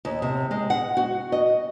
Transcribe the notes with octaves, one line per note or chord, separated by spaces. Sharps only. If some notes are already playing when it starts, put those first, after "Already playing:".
D#2
C3
G#3
F#5
F#4
D#5